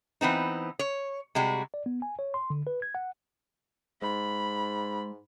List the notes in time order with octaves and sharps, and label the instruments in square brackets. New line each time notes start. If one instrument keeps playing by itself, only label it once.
[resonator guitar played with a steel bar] E3 B3 C4 D#4
C#5
C3 G3 G#3 F#4
[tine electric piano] D5
B3
G#5
C#5
C6
D3
B4
G#6
F#5
[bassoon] G#2 [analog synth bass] G#3 [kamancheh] B5